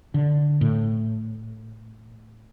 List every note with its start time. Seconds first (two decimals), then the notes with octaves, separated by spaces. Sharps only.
0.14 D3
0.61 A2